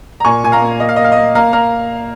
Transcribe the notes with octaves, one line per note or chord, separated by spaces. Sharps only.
A#5
A#2 G#5 C#6
A#2 G#5
F5 A#5
A#3
A#3 D#5
F5
A#3 D#5
F5
A#3 D#5
A#3 F5 A#5
A#3 F5 A#5